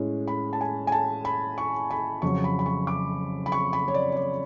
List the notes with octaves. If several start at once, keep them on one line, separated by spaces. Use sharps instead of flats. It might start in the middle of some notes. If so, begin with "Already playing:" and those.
Already playing: A2 G#3 C#4
B5
A5
G#5
G#5
A5
B5
C#6
B5
F2 C#3 F#3 C#6
B5
B5
C#6
D6
B5
C#6
B5
C#5
D5
C#5
D5